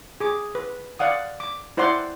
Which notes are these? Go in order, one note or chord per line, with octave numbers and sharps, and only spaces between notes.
G#4 D6
B4
D5 F5 F#5 D#6
D6
E4 C5 D5 F#5 C6 D6